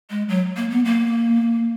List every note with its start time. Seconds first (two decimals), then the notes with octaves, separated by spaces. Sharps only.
0.10 G#3
0.29 F#3
0.57 A#3
0.71 B3
0.85 A#3